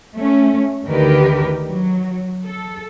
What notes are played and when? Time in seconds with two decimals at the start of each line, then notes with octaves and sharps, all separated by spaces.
0.16 A3 C#4
0.85 D2 D3 D#3 G4 A#4 B4
1.71 F#3
2.44 A4